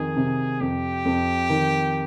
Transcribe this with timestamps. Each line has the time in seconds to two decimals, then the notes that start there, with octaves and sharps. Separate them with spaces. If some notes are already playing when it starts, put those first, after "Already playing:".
Already playing: F2 D#3 G#4
0.16 C3
0.61 F2 G4
1.05 F2
1.49 D#3